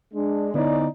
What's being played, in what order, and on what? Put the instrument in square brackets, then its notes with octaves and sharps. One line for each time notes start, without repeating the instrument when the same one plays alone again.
[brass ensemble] G#3 D4
[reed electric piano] D3 B3 E4 [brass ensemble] C#4 D#4 D5